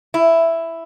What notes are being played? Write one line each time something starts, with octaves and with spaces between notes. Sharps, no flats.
E4